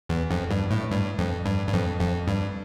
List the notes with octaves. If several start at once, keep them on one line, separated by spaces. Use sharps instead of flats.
E2
F2
G2
A2
G2
F2
G2
G2
F2
F2
G2